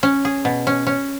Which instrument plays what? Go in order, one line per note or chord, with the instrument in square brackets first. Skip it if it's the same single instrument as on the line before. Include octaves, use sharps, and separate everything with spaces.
[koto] C#4
G#4
B2
C#4
C#4